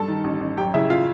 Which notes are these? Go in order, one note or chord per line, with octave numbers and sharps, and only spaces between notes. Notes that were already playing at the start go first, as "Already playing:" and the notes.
Already playing: G2 A4 A5
D#3
A1
A1
F#2 G4 G5
C#3 E4 E5
F4 F5